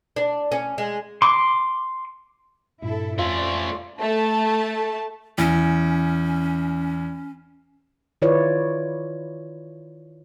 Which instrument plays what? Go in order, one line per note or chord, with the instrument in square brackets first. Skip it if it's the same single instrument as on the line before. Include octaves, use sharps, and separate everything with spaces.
[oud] D4
C#4
G#3
[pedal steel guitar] C6 D6
[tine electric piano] G2 A#2 [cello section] E4 A4
[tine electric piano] F2 [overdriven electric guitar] A3 C#4 [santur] F4 [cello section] C5 D5
[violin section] A3 A5
[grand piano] E2 [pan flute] C#4
[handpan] D#3 E4 F4 B4 C#5 D5